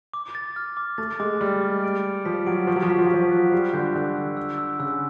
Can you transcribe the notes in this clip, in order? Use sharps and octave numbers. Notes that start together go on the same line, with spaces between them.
D6
A6
F6
D6
A3 A6
G#3 D6
G3 F6
D6
D7
D7
F3 B6
F#3 D7
F3 C#6
F#3
F3
F#3 B6
F3
F#3
F3 B6
F#6
G3 C7
D3 G6
D3 E6
E6
E6
E6
C#3 E6